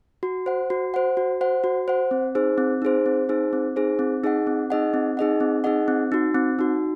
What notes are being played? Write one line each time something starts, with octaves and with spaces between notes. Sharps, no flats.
F#4
C5 F#5
F#4
C5 F#5
F#4
C5 F#5
F#4
C5 F#5
C4
D#4 G#4 C5
C4
D#4 G#4 C5
C4
D#4 G#4 C5
C4
D#4 G#4 C5
C4
D#4 G#4 D#5 F#5
C4
D#4 G#4 D#5 F#5
C4
D#4 G#4 D#5 F#5
C4
D#4 G#4 D#5 F#5
C4
D#4 F#4
C4
D#4 F#4